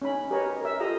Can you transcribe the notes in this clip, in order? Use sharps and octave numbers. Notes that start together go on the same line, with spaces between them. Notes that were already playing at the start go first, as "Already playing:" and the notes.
C#4 D#4 B5
G4 A#4 B4 C#5 D#5
A#4 E5
F4 G4 A4 D#5 F5 A#5